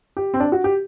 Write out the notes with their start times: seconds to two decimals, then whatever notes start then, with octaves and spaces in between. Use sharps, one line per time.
0.17 G4
0.34 C4
0.40 D4
0.52 F#4
0.64 G4